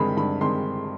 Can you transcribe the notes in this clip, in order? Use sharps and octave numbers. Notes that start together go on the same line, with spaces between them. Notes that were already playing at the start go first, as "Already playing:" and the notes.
Already playing: G2 D#3 G#3 C4 B5
G2 B5
D#3 G#3 C4 C6